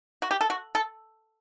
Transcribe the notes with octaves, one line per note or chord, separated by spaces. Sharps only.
F#4
G4
A4
F#4
A4